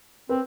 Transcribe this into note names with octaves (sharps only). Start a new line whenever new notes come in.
C4 B4